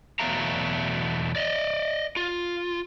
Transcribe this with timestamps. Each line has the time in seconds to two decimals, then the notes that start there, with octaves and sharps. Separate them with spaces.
0.19 E2 B2 F#3 A3 F5 A#5
1.36 D5 D#5
2.17 F4